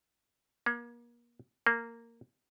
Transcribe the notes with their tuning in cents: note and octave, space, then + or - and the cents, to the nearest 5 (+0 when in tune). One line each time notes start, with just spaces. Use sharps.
A#3 +35
A#3 -10